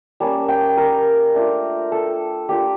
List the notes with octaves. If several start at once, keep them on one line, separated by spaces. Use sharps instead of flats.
G3 A#3 C#4 A5
G5
A#4
A3 D4 F4
A4
A#3 D4 F4 G4